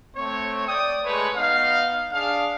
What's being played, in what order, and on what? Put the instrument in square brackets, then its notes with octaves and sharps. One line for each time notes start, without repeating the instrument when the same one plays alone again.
[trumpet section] A3 C4 C#5
D5 G5 D#6
G#3 A3 B4 C#5
B3 D#4 F5
D4 G#4 F5